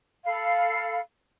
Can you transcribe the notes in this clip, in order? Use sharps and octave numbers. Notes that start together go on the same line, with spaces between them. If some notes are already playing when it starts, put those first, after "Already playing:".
A4 F5 B5